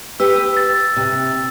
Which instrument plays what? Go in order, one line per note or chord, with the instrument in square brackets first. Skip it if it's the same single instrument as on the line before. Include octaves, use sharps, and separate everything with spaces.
[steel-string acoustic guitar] G4 B4 [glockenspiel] E6
[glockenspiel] E6
A6
[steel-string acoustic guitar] C3